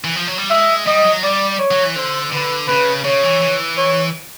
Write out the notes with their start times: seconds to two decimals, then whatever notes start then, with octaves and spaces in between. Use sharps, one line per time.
0.04 E3
0.16 F3
0.27 F#3
0.38 G3
0.50 G#3 E5
0.87 G3 D#5
1.04 F#3
1.23 G3 D5
1.59 C#5
1.71 F#3
1.83 E3
1.96 D3 C5
2.32 D3 B4
2.68 C#3 B4
3.04 C#3 C#5
3.23 E3
3.42 E3
3.77 C#5